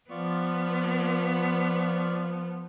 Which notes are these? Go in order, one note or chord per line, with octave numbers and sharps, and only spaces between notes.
F3 B3 F4 D5 C#6